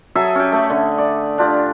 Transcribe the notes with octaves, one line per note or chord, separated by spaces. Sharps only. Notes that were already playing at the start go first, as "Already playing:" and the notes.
F#3 G#4 A4 E5
C#4 G4
A3 G#4
D3
D5
D4 F4 G4